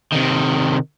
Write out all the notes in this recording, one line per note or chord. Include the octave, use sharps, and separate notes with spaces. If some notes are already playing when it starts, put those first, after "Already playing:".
C3 D#3